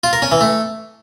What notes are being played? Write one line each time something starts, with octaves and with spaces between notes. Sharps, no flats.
F4
A#4
C#4
E3
A3